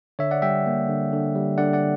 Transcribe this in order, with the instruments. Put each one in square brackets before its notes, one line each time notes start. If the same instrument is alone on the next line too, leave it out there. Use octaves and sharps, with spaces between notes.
[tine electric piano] D3 C#5 E5
D5 F#5
G3 E5 G5
A#3
D3
D3
G3
D3 D5 F#5
D5 F#5